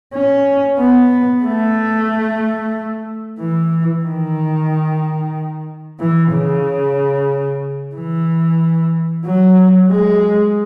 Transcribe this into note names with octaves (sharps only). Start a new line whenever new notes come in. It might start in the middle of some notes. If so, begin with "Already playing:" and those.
C#4
B3
A3
E3
D#3
E3
C#3
E3
F#3
G#3